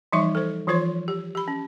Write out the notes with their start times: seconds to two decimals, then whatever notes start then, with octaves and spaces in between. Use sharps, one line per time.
0.12 E3 F3 G3 D#4 E5 C#6
0.35 A4 C5
0.67 E3 F3 F4 C5 C#5 C6
1.08 G4
1.35 G4 B5
1.48 C#4